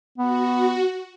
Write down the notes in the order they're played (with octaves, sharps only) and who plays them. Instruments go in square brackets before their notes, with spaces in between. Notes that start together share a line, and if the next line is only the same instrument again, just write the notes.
[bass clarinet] B3 [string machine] F#4